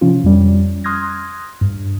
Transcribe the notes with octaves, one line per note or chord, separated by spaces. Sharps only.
C3 F3 C#4 F4
F2 G3 C#4
C6 D#6 F6 F#6 G#6 A#6
G2